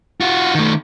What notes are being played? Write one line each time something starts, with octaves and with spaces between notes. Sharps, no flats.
F4 F#4
D#3 A3